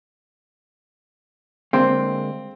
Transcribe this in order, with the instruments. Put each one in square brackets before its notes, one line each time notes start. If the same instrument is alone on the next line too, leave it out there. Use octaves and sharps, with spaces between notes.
[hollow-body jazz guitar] D3 G#3 A#3 [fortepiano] C4